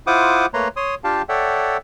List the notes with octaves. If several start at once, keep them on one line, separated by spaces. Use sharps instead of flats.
E4 F4 C5 F#5 D6 D#6
A3 A#3 B4 C#5 A#5 C6
C#5 C6 D#6
D4 F4 G4 F5 G5 A5
A4 C#5 D5 E5 F#5 G5